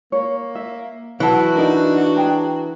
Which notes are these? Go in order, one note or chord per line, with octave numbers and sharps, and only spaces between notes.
A#3 C#5
E5
E3 F#3 F#4 A5
D4 D#4 A#4
G#4 G5 A#5